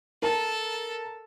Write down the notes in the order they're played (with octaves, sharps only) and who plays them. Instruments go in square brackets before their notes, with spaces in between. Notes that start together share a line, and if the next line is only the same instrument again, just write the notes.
[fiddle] A4 [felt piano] A#4 A5